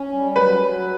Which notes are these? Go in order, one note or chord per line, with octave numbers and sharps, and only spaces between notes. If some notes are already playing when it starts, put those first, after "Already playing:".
Already playing: C#4
G3
F#3 B4
F#3